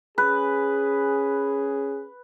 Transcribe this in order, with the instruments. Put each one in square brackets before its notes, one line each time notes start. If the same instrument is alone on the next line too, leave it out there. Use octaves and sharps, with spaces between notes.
[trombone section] C#4 G#4 [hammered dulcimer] B4